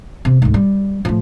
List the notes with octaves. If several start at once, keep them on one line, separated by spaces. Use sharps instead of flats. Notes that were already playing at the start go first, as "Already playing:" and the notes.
C3
D2 G#2
G3
A2 F3